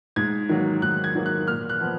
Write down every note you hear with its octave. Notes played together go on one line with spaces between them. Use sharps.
G#2 G#6
D#3 F#3 A#3
G#2 F#6
G#6
D#3 F#3 A#3
F#6
A#2 F6
F#6
F3 B3